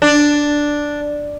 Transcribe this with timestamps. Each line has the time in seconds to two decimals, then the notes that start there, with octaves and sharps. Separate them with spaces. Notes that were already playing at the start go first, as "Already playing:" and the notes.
0.02 D4